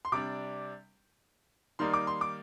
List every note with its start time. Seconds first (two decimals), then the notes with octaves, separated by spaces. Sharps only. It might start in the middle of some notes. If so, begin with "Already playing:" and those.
0.05 C6
0.12 C3 G3 D4 D6
1.79 D#3 G3 A#3 D#4 C6
1.94 D6
2.07 C6
2.21 D6